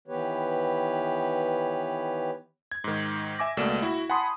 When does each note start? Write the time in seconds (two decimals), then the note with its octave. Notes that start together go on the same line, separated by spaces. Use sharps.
0.08 D#3 E3 B3 G4 B4 C#5
2.72 G#6
2.84 G#2 D#3
3.39 E5 G#5 D6 A#6
3.57 C#2 B2 A3 A#3 D5 E7
3.82 E4 F#4
4.10 F#5 G#5 A5 B5 C6 D#6